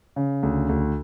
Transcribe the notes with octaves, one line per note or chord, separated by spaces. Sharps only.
C#3
D2
D2